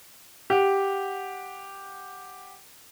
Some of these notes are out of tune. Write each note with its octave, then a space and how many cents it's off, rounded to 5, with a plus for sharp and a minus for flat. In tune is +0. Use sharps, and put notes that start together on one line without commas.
G4 +0 F#5 +0